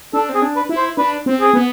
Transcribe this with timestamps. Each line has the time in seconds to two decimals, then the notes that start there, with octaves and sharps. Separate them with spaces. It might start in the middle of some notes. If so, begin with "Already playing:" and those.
0.13 D4 A4
0.29 C4
0.35 G#4
0.42 D4
0.56 B4
0.69 E4
0.77 C5
0.97 D4 B4
1.26 C4
1.40 G#4
1.54 B3